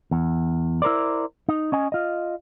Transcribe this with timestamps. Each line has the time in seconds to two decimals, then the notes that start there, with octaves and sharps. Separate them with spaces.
0.11 E2
0.82 E4 A#4 C5 D5
1.49 D#4
1.72 C#4 D#5 G#5
1.92 F4 D#5